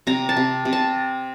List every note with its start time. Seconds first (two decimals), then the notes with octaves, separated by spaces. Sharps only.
0.07 C3 A#5
0.29 A5
0.37 C3
0.65 C3
0.73 A5